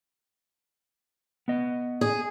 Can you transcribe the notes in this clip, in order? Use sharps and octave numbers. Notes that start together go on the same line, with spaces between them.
B3 D#5
G#4